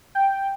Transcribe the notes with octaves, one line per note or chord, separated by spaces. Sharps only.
G5